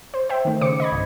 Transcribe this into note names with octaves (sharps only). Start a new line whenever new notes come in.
C5
C5 E5 G5
D#3 A3
C#3 C5 D6 C#7
D#5 B5 G#6
C2 G2